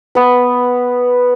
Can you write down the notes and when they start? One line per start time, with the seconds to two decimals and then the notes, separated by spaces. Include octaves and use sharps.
0.15 B3 B4